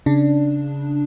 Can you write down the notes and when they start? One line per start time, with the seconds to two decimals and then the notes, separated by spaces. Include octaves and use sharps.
0.06 C#3 D4